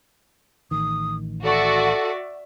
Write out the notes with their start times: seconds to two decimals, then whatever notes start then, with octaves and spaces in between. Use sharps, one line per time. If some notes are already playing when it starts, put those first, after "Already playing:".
0.71 A1 D#3 D#6
1.44 F#4 A4 D5 E5